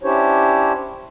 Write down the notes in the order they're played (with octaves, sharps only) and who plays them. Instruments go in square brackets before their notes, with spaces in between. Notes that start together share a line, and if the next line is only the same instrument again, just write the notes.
[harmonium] C#4 D4 E4 G4 C5 C#5